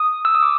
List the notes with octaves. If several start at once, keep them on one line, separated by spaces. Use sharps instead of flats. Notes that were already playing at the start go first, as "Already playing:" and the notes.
Already playing: D#6
E6
D#6
D6